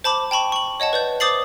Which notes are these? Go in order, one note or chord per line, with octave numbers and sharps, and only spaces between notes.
C5 A5 B5 D6
G5 A5 B5 C#6
C#6 F#7
C#5 D#5 F#5 A5
B4 D5 G6
C5 D6 D#6 A6 C7 F#7